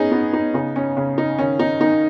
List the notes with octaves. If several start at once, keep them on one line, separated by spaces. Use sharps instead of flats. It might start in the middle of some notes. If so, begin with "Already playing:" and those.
Already playing: B3 C#4 D#4 G#4
B3 D#4
D#4
C#3 D#4
C#4
C#3 C#4
D#4
D#3 C#4
D#4
D#3 D#4